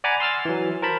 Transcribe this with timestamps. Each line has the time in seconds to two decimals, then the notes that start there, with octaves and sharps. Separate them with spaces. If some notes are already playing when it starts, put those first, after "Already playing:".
0.04 D5 F#5 G#5 A#5 B5 D6
0.20 C6 E6 F6 A6
0.45 E3 F#3
0.82 A#4 C5 A5 B5